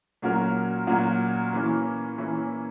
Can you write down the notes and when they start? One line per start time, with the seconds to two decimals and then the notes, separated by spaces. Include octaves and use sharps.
0.22 A#2 F#3 C#4 F#4 A#4
0.87 A#2 F#3 C#4 F#4 A#4
1.53 E3 A#3 C#4 E4
2.18 E3 A#3 C#4 E4